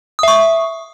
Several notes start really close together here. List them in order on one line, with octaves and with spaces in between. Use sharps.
D#6 E5 C#6